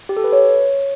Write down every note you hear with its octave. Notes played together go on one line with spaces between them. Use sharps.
G4
A4
B4
C#5